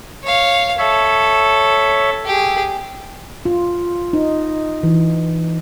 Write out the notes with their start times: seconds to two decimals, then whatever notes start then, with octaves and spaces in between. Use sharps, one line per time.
0.23 C#5 F5
0.78 A4 C#5 E5
2.26 G4 G#4
3.45 F4
4.13 D#4
4.83 E3